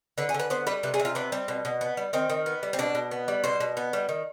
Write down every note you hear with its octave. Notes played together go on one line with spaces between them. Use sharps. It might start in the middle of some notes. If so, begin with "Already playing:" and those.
D3 B4
G#4
D3
B4
B3 C5
G3 B4
C3 B4
G#4
C3
F4
B3 D4
G3 C4
B2
B2
B3
G3
D#3 C4
D#3
B3
G3
C4
B2 D4
B2
B3
G3
B2 C5
B2
B3
G3
D#3